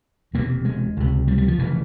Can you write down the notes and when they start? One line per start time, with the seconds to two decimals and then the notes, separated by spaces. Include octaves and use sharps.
0.33 E1 E2 C3 A#3
0.65 G#3
0.97 C#2 C3
1.28 G3
1.38 G3
1.48 F3
1.58 F1 C#3 E3